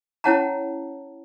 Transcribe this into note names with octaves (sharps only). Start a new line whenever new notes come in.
C#4 E4 C#5 F#5 A5 A#5